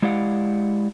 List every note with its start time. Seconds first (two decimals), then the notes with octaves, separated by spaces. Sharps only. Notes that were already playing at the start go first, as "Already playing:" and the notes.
0.02 G#3 E4 G4 D5 F5 F#5